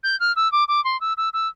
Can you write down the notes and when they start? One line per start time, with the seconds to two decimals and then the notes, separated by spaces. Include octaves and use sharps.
0.03 G6
0.20 F6
0.36 E6
0.52 D6
0.68 D6
0.84 C6
1.01 E6
1.17 E6
1.33 E6